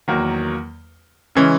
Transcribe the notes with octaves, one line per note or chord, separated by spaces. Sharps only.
E2 D#3 F#3 A#3
C#3 E3 G#3 C#4